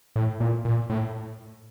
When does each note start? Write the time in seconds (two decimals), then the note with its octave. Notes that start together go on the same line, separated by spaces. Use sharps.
0.16 A2
0.40 A#2
0.65 A#2
0.90 A2